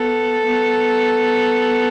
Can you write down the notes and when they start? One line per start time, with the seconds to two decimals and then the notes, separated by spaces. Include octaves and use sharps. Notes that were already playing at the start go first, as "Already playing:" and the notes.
Already playing: B3 A4
0.47 B3